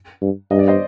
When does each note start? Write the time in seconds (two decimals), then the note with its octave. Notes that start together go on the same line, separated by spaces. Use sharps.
0.22 G2
0.51 G2 D#5
0.59 D5
0.68 C5 D#5